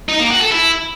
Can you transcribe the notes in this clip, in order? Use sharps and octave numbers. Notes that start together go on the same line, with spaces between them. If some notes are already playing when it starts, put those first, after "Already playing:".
D#4
A#3
F#4
A4
E4